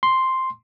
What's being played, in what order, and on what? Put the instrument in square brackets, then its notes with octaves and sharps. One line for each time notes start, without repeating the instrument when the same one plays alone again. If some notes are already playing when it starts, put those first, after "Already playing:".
[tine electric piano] C6